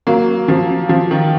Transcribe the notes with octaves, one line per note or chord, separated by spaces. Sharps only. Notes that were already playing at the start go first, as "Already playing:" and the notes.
F#3 A#3
F3
F3
D#3